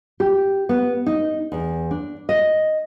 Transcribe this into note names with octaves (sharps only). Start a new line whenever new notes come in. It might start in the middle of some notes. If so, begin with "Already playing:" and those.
G4
B3
D#4
E2
D4
D#5